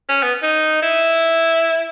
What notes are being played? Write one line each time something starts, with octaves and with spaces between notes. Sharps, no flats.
C#4
B3
D#4
E4